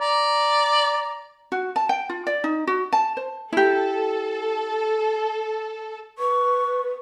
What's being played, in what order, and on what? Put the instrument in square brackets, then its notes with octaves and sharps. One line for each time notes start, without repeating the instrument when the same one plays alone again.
[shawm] D5 [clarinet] A#5
[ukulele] F#4
A5
G5
F4
D5
D#4
F#4
A5
C5
[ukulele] E4 G4 [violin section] A4
[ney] B4 [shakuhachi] C#6